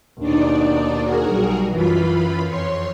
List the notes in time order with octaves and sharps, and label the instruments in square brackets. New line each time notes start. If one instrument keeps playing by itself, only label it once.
[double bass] D#2 B2 [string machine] D4 D#4 D5
[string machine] F#4 G#4 A#4
[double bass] B1 G3
[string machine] F#2 F4 B5 [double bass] E3
[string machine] F2 C#5 C6